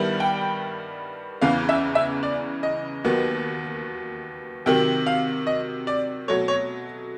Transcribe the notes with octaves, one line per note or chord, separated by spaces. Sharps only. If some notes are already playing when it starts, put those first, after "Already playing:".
Already playing: G2 D#3 G3 B3 E4
G5
E2 C#3 E3 F5
E5
E5
D5
D#5
D#2 D#3 F#3 B3
C3 D#3 F#3 G5
F5
D#5
D5
B2 F#3 A3 C#5
C#5